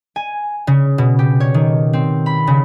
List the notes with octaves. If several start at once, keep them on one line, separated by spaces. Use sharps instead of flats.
G#5
C#3
B2
G4
C#5
D#3
C4
B5
C#3